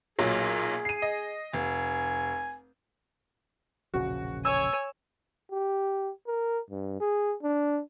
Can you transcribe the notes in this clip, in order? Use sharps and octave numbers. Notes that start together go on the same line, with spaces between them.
B1 A#2 F#3 G#4
C7 D#7
D#5
F1 G#5
E1 A#1 C#3 F#4
C#5 G#5 E6
G4
A#4
G2
G#4
D4